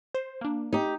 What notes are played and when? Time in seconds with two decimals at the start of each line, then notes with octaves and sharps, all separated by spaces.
0.14 C5
0.41 A#3 D4
0.73 D#4 G4